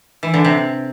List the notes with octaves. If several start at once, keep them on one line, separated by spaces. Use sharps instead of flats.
E3
D3
C3